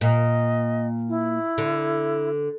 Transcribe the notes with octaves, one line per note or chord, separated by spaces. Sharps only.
A#2 D#5
E4
D3